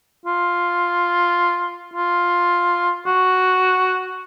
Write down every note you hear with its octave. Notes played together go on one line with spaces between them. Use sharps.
F4
F4
F#4